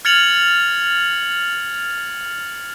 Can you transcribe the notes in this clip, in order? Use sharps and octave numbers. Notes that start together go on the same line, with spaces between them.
F6 G#6 A6 C#7 F7 F#7